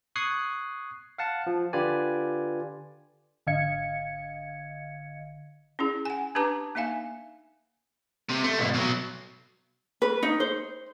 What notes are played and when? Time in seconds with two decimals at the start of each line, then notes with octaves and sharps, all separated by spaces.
0.16 C#6 D#6 F#6 G#6 C7
1.18 F5 F#5 A5
1.47 F3
1.73 D3 F4 G4 B4 D5 G#5
3.47 G#1 D3 D#5 F5 G#6 C#7
5.79 C#4 E4 G#4
6.05 F#5 G#5
6.35 D4 G4 B4 A5 A#5 D6
6.75 A#3 D#4 E5 F5 G#5
8.29 C3
8.44 A3
8.58 C2 F2
8.74 B2 F#3
10.02 B4
10.23 D#4
10.40 C5